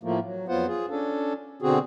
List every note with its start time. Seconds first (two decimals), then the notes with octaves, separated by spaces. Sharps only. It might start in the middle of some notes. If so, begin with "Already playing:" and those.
0.03 A2 F3 A3 A#3
0.24 F#3
0.48 F2 F#3 B3 F4 C5 F#5
0.67 F4 G#4
0.90 C#4 D4 A4
1.62 B2 D3 C4 F#4 G#4